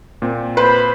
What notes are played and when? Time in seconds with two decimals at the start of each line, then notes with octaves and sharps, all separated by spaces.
0.22 A#2 C4
0.57 B4 C5 B5